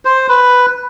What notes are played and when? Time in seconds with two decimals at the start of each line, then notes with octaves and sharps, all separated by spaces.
0.05 C5
0.29 B4